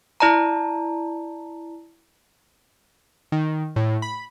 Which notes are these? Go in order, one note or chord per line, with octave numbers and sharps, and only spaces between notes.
E4 D5 A5 A#5
D#3
A2
B5